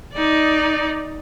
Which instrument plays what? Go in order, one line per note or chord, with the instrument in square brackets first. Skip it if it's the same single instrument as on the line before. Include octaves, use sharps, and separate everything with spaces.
[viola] D#4 D5